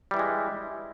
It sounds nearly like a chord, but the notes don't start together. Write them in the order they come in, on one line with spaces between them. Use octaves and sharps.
G3 E3 E4 G#3